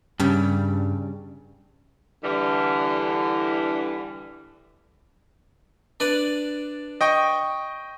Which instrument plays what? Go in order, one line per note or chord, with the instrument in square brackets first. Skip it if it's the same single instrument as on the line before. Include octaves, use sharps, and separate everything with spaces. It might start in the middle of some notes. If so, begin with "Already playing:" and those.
[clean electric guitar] G2 [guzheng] C#3 G3
[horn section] D3 E3 G3
[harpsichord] D4 B4 D5
[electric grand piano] D#5 G5 C#6